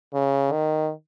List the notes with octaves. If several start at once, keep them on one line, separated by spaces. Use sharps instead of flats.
C#3
D#3